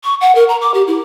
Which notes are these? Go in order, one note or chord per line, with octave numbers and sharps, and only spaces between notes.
C#6
F#5
A#4
A#5
D6
G4
E4